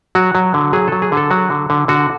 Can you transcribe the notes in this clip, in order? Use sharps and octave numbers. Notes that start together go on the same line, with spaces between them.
F#3 F#4
F#3
D3
F#3 G#4
F#3 A4
G#4
D3 A4
F#3 F#4
D3
D3
D3 F#4